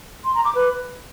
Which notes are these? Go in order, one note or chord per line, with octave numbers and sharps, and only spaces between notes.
C6
A#5
D6
B4